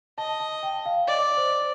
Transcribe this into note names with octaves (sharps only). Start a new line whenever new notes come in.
D#5 A5
A5
G5
F5
D5 D#5
C5